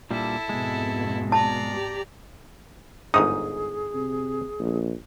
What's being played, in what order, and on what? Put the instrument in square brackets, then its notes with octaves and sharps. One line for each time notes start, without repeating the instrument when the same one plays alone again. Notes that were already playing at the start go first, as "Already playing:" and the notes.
[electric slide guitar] A#2 G3 D4 [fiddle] E4 A4
[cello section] F2 G#2 B2 [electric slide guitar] G#3
[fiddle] D5 A#5 [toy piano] A5
[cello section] G4
[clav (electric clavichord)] G1 G#2 D#4 [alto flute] G#4 [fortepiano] D#6
[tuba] C3
A#1